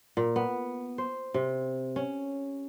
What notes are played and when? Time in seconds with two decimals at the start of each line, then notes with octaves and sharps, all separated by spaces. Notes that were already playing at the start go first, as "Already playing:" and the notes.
0.17 A#2
0.36 B3
0.98 C5
1.34 C3
1.96 C#4